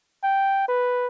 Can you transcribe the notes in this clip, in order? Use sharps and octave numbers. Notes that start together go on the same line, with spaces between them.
G5
B4